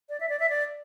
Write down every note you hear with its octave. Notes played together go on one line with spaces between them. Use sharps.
D5
E5
D5
E5
D5